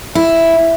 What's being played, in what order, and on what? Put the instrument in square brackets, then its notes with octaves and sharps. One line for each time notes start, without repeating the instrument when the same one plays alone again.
[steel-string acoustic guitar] E4